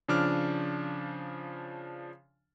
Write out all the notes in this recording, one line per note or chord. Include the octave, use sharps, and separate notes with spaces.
C#3 F3 D4 D6 F6